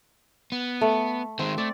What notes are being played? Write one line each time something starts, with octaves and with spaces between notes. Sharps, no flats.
B3
A3
D#3 G#3 C4
A3 D5